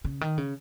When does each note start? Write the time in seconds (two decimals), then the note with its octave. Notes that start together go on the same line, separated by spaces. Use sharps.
0.04 C#3
0.21 D#3
0.38 C#3